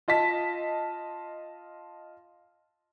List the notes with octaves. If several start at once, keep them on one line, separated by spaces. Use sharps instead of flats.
F4 D#5 A5 B6